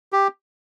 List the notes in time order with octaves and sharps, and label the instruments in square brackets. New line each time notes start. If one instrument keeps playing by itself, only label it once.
[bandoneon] G4